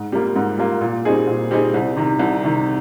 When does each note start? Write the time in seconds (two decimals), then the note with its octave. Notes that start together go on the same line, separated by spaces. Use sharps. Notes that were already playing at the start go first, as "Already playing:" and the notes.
Already playing: G#2
0.12 G3 A#3 F4
0.36 G#2
0.58 G3 A#3 F4
0.81 A#2
1.05 G3 C4 D#4 G#4
1.27 A#2
1.51 G3 C4 D#4 G#4
1.74 C2
1.96 C3 D#3
2.19 C2
2.44 C3 D#3